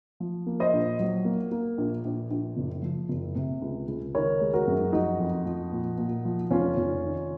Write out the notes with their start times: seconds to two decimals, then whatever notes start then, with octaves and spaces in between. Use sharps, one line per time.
0.20 F3
0.46 A#3
0.60 C5 D#5
0.73 A#1
1.00 F#3
1.25 A#3
1.51 A#3
1.78 A#1
2.05 A#1
2.31 A#1
2.57 F#1
2.82 F3
3.09 F#1
3.35 C3
3.62 C#2
3.88 C#2
4.15 D#3 A#4 C#5
4.41 G#3
4.54 F#4 A#4
4.67 F#2
4.93 F3 D#4 F#4
5.20 F2
5.46 F3
5.72 A#2
5.98 A#2
6.25 F3
6.51 F1 C#4 F4
6.77 F1
7.03 D#3